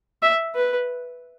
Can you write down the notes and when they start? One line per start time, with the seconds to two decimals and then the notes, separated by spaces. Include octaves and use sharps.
0.23 E5
0.55 B4